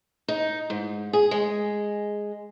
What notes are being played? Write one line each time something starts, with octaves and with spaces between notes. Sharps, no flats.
D#4
G#2
G#4
G#3